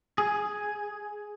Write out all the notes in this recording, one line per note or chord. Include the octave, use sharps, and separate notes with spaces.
G#4